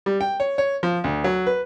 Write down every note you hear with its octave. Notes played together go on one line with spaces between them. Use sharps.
G3
G5
C#5
C#5
F3
D2
F#3
B4